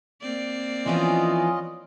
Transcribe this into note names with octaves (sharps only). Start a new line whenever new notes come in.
A#3 C4 D5
E3 F3 B3 C#4 F4 D#5